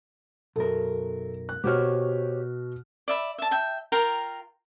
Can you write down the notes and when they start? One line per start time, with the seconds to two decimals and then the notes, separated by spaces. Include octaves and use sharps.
0.56 B1 F#2 A4 A#4
1.49 F#6
1.64 B2 F#4 G4 C5 C#5 F6
3.08 D5 E5 B5
3.38 E5 A5
3.51 E5 G5
3.92 F4 A#4 G5 A#5